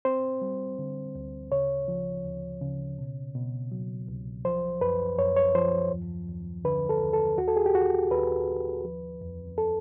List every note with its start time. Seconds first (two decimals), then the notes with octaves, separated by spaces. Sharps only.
0.05 C4 C5
0.42 G3
0.79 D3
1.15 D2
1.52 C#3 C#5
1.88 F3
2.25 D2
2.62 C#3
2.98 B2
3.35 B2
3.72 F#3
4.08 C2
4.45 F3 C5
4.81 F#2 B4
5.18 F#2 C#5
5.36 C#5
5.55 F3 C5
5.91 D#2
6.28 D#2
6.65 D3 B4
6.89 A4
7.01 D#2
7.13 A4
7.38 D#2 F#4
7.48 A4
7.57 G#4
7.66 G4
7.75 D#2 F#4
8.11 D#2 B4
8.48 D#2
8.85 F3
9.21 F2
9.58 A4